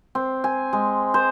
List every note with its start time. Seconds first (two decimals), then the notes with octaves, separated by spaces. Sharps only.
0.15 C4
0.44 G#5
0.73 G#3
1.14 C5